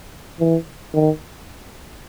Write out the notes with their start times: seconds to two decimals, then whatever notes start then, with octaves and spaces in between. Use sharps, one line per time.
0.40 E3
0.94 D#3